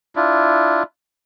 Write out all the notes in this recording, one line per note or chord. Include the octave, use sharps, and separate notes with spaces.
D4 E4 F4